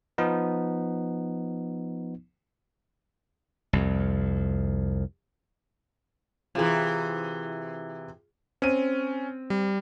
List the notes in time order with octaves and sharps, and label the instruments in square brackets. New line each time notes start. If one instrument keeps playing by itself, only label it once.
[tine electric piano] F3 B3 D#4
[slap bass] C2 F2
[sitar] C3 E3 [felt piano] F4 G#4
[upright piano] C4 D#7 [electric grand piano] C#4
[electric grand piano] G3